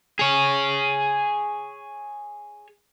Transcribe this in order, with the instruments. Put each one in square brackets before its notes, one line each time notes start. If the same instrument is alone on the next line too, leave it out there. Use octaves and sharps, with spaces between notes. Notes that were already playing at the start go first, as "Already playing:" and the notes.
[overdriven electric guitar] G#4 C#5